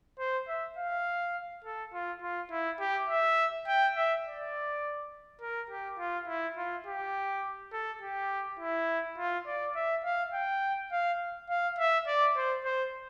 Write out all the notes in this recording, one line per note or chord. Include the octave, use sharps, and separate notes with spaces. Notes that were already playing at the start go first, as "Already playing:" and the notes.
C5
E5
F5
A4
F4
F4
E4
G4
E5
G5
E5
D5
A#4
G4
F4
E4
F4
G4
A4
G4
E4
F4
D5
E5
F5
G5
F5
F5
E5
D5
C5
C5